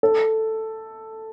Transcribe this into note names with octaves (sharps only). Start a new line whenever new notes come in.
A4